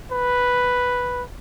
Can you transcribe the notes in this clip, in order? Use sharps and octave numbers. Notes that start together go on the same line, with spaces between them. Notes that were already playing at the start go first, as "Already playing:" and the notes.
B4